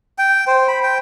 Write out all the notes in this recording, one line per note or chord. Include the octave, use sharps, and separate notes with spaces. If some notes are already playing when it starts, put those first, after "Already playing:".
G5
C5
B5
G5